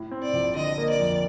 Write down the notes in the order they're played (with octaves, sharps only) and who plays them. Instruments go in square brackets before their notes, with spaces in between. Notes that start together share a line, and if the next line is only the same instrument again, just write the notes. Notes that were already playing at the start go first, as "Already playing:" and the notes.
Already playing: [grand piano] A2
C4
[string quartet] D5
[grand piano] A#1
[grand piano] D3 [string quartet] D#5
[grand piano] A#3
[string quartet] D5
[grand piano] F2